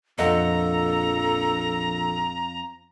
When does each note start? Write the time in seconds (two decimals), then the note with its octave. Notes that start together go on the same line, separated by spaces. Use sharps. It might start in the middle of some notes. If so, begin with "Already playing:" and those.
0.19 A#1 F2 A4 D#5 F#5 A#5